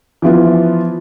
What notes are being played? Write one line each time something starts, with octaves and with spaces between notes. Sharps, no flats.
E3 F3 B3 F4